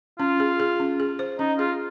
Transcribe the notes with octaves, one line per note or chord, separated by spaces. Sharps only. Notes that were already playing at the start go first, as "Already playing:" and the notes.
C#4 F4
G#4
G#4
C#4
G#4
C5
C#4 D#4
F4 G#4